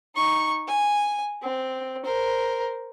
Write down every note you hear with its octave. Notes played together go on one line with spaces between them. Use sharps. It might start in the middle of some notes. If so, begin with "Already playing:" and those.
D#4 C#6
G#5
C4
A#4 C5